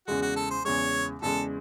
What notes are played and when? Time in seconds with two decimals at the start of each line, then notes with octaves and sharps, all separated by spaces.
0.07 E2 C#3 G#3 F#4
0.22 F#4
0.36 A4
0.51 C5
0.65 E2 C#3 G#3 C#5
1.22 E2 C#3 G#3 A4